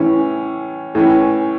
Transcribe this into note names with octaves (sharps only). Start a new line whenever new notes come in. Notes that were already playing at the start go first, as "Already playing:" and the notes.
Already playing: A2 E3 C#4
A2 E3 C#4